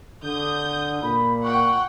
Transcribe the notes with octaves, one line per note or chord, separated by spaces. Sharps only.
D3 D#6 G6
A#2 B5
F#5 G5 C#6